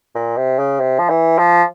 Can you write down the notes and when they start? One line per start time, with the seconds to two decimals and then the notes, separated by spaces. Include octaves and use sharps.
0.15 A#2
0.37 C3
0.59 C#3
0.80 C3
0.99 F3
1.10 E3
1.38 F3